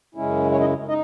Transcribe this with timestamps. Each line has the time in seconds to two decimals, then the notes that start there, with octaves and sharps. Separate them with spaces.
0.15 F#2 C#3 G#3 C#4 E4
0.51 C#4 C#5
0.61 D#4 D#5
0.88 D#4 D#5